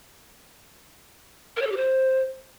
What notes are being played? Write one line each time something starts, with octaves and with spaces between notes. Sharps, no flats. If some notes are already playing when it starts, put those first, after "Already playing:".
A#4
C#5
A4
G4
C5